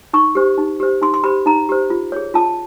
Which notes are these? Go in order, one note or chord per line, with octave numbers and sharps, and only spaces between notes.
D#4 C#6
G4 C5
D#4
G4 C5
D#4 C6
C6
G4 C5 B5
D#4 A#5
G4 C5
F4
G#4 C#5
F4 A5